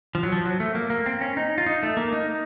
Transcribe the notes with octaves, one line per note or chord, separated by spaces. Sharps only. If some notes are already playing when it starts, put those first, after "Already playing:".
F3
F#3
F3
F#3
A3
A#3
A#3
C4
C#4
D#4
F4
D#4
A3
A#3
D#4